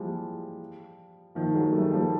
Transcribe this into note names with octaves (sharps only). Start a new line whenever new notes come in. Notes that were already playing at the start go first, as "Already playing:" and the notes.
Already playing: E3 F3 G3 G#3
D#3 F3
F#3 G#3
G3 A3
F3 G3